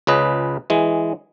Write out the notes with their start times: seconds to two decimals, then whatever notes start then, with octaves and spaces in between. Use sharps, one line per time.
0.07 C#2 C#3 B4 D#5
0.70 E3 G#3